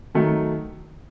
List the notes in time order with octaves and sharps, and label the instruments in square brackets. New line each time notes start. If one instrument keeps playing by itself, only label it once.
[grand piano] D#3 F#3 A3